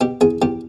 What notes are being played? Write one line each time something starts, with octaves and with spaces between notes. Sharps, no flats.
B2 G4
E2 G#4
E2 G4